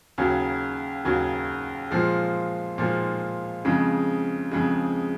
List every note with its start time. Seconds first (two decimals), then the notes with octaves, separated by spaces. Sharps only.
0.18 D#2 C#3 F#3
1.05 D#2 C#3 F#3
1.91 A#2 F3 G#3
2.78 A#2 F3 G#3
3.65 F2 C#3 G#3
4.51 F2 C#3 G#3